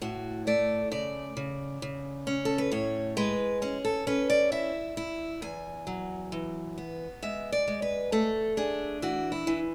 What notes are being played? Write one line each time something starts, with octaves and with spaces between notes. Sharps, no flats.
A2 F#4
A3 D5
C#3 D5
C#3
C#3
C#4
A4
B4
A2 C#5
G#3 B4
C#4 G#4
A4
C#4 B4
D5
E4 E5
E4
E2 G#5
F#3
E3
B3
G#3 E5
D5
G#3
B4
A3 A4
D4 G#4
E3 F#4
E4
E3